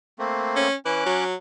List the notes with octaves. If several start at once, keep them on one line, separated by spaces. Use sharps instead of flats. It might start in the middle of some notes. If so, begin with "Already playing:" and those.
A3 A#3 C4
C#4
E3 C#4 D6 F#6
F#3